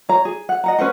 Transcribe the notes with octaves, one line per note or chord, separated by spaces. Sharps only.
C#5 A#5
G#4
F#5
D#5 F#5 A#5
C#4 B4 C5 F#5